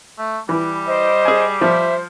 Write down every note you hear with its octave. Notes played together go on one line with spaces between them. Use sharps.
A3
E3 G3
C5 D#5
G#4 G#5
F3 C5 E5